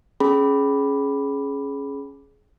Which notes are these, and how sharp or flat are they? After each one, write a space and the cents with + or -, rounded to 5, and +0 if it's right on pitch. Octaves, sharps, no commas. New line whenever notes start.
C#4 +0 G#4 +20 B5 +0